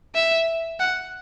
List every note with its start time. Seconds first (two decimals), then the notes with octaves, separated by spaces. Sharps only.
0.15 E5
0.80 F#5